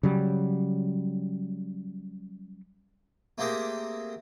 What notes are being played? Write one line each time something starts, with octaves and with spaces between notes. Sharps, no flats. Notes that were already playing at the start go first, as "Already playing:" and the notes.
C#3 F#3 G3
A3 A#3 C4 G4 G#4 A#4